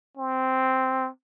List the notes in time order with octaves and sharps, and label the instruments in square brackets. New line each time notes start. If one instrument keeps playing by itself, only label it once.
[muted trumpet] C4